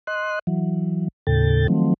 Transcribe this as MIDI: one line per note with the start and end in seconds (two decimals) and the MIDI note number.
0.07 0.39 75
0.07 0.39 84
0.07 0.39 90
0.47 1.08 52
0.47 1.08 54
1.27 1.67 39
1.27 1.67 45
1.27 1.67 49
1.27 1.67 69
1.27 1.67 79
1.27 1.67 93
1.68 1.94 51
1.68 1.94 53
1.68 1.94 54
1.68 1.94 57
1.68 1.94 60